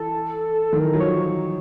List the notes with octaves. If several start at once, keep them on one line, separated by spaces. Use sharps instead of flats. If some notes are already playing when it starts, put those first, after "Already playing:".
Already playing: E3 A4
D#3
E3 A#4
F#3
F3 C#5